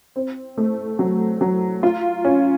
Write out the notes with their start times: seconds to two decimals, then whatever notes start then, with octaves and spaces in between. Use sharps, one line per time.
0.16 C4
0.58 A3
0.99 F#3
1.41 F#3
1.83 F4
2.25 C#4